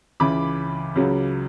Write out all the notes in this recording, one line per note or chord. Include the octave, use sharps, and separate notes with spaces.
C#2 C#3 E3 B5 D6
C#2 C#3 F#3